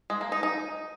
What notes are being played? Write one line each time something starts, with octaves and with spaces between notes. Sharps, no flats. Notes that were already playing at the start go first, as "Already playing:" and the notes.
G#3
A#3
D#4
D#4